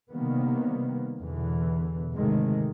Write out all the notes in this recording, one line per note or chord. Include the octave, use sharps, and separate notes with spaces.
C3 D#3 G3 A#3 B3
E2 B2 D3 E3
G#1 D2 C3 D#3 G#3 A3